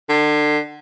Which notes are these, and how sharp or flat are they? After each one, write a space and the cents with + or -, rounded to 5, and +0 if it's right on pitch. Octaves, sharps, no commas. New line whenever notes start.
D3 +30